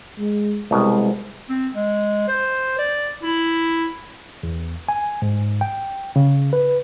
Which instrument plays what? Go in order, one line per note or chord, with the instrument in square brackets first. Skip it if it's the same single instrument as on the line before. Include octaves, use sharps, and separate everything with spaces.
[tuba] G#3
[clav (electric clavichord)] C2 B2 [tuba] G#3
[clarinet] C4
G#3
C5
D5
E4
[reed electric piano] E2
G#5
G#2
G5
C#3
B4